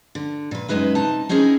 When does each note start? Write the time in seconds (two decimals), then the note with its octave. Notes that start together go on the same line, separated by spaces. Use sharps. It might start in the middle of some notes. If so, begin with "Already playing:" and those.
0.15 D3
0.51 A#2 B4
0.68 F#2 F3 G#3 D#4 B4 E5
0.95 C3 D#4 A5
1.29 C4 C#4 D#4 E4 G#4 A#4